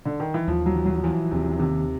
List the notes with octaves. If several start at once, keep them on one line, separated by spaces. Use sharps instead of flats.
D3
D#3
E3
D#2 F3
F#3
E3
F#3
E3 F3
D#2 C3
C3 D#3